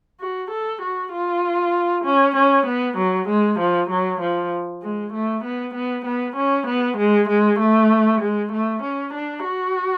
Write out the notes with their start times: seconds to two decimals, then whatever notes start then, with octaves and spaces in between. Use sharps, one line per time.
0.20 F#4
0.51 A4
0.82 F#4
1.13 F4
2.05 C#4
2.36 C#4
2.66 B3
2.98 F#3
3.29 G#3
3.59 F3
3.90 F#3
4.21 F3
4.83 G#3
5.13 A3
5.44 B3
5.75 B3
6.06 B3
6.37 C#4
6.67 B3
6.98 G#3
7.29 G#3
7.60 A3
8.21 G#3
8.53 A3
8.83 C#4
9.14 D4
9.45 F#4